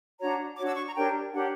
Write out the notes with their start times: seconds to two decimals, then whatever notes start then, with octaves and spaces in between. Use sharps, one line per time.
0.20 D4 F#4 C#5 A#5
0.58 D4 F#4 C#5 D6
0.68 E6
0.76 C#6
0.87 A#5
0.96 D4 G4 A#4 C#5 G5
1.32 D4 G4 A#4 C#5 F#5